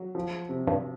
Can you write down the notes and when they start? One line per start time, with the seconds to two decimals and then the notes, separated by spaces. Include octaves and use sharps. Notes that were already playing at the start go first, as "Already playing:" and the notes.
Already playing: F#3
0.15 F3
0.49 C3
0.67 G2